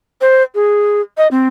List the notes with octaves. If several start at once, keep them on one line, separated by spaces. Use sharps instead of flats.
C5
G#4
D#5
C4